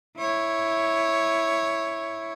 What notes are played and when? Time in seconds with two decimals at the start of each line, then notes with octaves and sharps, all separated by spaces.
0.18 E4 C#5